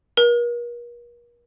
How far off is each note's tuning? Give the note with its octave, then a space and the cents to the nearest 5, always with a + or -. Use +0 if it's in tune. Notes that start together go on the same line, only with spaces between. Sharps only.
A#4 +40